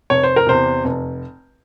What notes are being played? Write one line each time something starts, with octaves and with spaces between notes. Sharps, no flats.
F1 C#5
C5
A#4
E2 C3 C5
F1